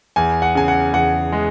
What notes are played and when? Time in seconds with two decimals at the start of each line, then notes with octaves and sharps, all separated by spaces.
0.16 E2 G#5
0.42 F#5
0.55 C#3 G#5
0.68 F#5
0.93 E2 F#5
1.32 G#3